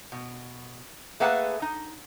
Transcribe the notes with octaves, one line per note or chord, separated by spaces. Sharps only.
B2
A3 A#3 G#4 B4 F#5 A5
D#4